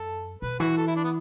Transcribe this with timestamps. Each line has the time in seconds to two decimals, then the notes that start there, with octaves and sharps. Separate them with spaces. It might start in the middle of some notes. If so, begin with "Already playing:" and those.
Already playing: F#2 A4
0.42 B2 B4
0.60 E3 F#4
0.77 A4
0.87 E4
0.96 D4
1.04 B3